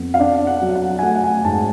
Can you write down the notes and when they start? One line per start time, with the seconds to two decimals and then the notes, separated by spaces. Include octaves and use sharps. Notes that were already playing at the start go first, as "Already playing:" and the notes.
Already playing: F2 B3
0.14 F5
0.19 D4 D5
0.47 F#5
0.62 F#3
0.75 F#5
0.99 G#5
1.03 A3 F#5
1.15 F#5
1.24 G#5
1.45 G#2 A5